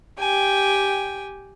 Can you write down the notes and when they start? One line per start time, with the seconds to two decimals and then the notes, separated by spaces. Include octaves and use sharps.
0.20 G4 G5 G#5